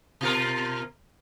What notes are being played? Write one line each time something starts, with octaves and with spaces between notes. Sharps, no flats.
B2 F4 A#4